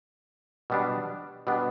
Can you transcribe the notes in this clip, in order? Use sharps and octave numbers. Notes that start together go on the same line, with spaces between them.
B2 G3 B3 D4
B2 G3 B3 D4